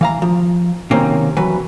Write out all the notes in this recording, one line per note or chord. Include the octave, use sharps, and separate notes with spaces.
E3 F5 A#5
F3
C3 D#3 F#3 A#3 C4 C#4
E3 F#3 B4